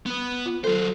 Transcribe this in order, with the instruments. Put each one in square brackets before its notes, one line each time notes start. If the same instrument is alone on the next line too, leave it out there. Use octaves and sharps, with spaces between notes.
[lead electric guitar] B3 B4
[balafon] F4
[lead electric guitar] F#3 C5 [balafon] A4